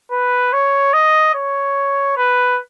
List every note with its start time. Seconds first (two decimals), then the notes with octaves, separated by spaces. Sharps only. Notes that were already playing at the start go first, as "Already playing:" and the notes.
0.12 B4
0.53 C#5
0.93 D#5
1.35 C#5
2.17 B4